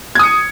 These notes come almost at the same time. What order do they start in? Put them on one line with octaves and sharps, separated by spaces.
G#6 D#6 C#7